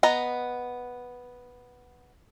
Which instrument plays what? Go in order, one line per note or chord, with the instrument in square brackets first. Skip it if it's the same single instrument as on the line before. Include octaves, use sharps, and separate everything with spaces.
[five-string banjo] B3 D#5 A#5